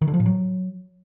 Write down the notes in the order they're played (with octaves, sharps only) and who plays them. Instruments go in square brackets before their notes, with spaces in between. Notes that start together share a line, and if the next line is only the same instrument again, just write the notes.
[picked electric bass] D#3
D3
F3
A2
F#3